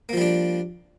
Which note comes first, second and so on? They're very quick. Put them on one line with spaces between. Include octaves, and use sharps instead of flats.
A#3 F3 G3 D4